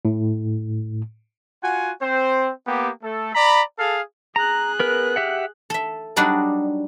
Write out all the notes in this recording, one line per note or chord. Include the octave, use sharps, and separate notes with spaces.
A2
F4 F#4 F#5 G#5
C4 C5
A#3 B3 G4
A3 A4
D5 A#5 B5
G#4 A4 F5
G#4 A#5 F#6
B3 A#4 B4
G4 E5 F#5
A4 E5
F#3 G3 D4 D#4 F#4 D5